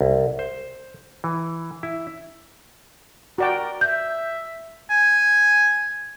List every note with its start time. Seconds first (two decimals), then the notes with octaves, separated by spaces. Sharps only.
0.01 C2
0.39 C5
1.24 E3
1.83 E4
3.38 F#4 A#4 D5 G5
3.81 E5 G6
4.90 G#5